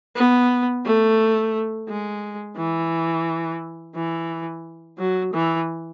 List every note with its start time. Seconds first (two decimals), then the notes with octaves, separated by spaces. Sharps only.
0.16 B3
0.85 A3
1.88 G#3
2.57 E3
3.95 E3
4.98 F#3
5.33 E3